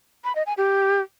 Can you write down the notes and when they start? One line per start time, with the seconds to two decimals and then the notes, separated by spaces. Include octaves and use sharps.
0.24 B5
0.35 D#5
0.46 G#5
0.58 G4